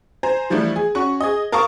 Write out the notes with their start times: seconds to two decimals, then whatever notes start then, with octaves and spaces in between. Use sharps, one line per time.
0.23 C5 G#5 A#5
0.50 E3 F3 G3 A3 D4
0.76 G#4
0.95 C#4 F#4 C#6
1.21 G#4 D#5
1.52 A#4 F5 A5 C#6 D#6